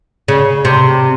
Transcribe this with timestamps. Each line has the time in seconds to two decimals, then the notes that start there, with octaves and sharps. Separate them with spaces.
0.28 C#3
0.65 C3